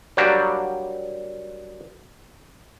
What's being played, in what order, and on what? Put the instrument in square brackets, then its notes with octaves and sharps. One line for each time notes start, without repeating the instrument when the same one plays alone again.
[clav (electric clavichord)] F#3 G3 A#3 D4 F#4 G4